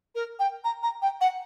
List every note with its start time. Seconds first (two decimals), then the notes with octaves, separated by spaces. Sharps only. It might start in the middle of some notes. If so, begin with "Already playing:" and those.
0.15 A#4
0.39 G5
0.64 A#5
0.82 A#5
1.02 G5
1.21 F#5